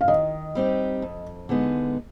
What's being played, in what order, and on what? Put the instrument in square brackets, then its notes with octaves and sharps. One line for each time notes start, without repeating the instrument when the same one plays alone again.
[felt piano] F5
[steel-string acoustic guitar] D#3 [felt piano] D#5
[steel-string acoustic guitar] G3 C4 D#4 G4
F2
D3 G#3 B3 D#4